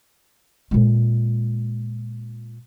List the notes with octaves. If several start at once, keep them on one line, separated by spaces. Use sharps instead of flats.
A#2 G#3